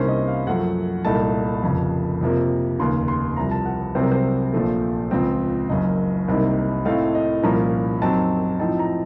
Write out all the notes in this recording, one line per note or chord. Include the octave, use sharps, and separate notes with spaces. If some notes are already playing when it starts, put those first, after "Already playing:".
Already playing: C2 C3 D#3 A#3 C#4 C5
D#5
F5
F#2 F3 A3 F#5
C2 A#2 A3 D#4 A5
F1 F2 C#3
F2 C3 F3 A#3
F1 D#2 C#3 C6
C6
C2 C3 F3 A#5
A5
F#5
C2 C3 F#3 C4 C5
A#4
C5
A#1 A#2 F3 A3
C#2 C#3 F3 C4
F#1 F#2 C#3 D#5
C2 C3 D#3 A#3 D#4
A2 A3 C4 D#4 F5
D#5
C2 A#2 F3 A#3 C#4 A#5
F#2 D#3 F#3 C4 D#4 A5
A2 F3 C4 D#4 A5
A#5